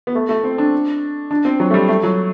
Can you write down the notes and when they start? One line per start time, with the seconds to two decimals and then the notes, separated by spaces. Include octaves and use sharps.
0.07 B3
0.15 A3
0.29 A3
0.44 C4
0.58 D4
1.31 D4
1.45 C4
1.60 F#3
1.70 A3
1.74 G3
1.88 A3
2.03 F#3